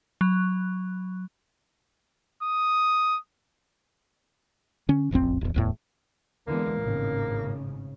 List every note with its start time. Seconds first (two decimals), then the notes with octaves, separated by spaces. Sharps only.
0.21 F#3
2.43 D#6
4.89 D3 C#4
5.11 E1 A1 F2 C4
5.41 D1 E2
5.54 D1 E2 A2
6.47 E2 D3 E3 G#3 A#3
6.79 G#1 A2 C#3